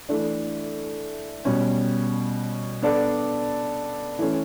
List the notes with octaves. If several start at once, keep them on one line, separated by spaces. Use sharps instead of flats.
E3 A3 D4
B2 G3 C#4
B3 D4 A4 D5
E3 A3 C#4